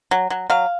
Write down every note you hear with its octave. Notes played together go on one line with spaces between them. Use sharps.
F#3
F#3
F#3 F5